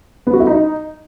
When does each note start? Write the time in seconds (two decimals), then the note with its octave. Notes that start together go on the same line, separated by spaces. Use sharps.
0.27 B3
0.33 F#4
0.40 E4
0.47 D#4